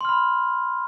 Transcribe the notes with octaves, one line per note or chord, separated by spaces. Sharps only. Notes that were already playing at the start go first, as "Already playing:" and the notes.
B5 C6 F6